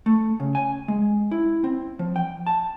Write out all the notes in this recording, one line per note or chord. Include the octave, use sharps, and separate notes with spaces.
A3
C#3
G#5
G#3
E4
C4
F3
G5
A5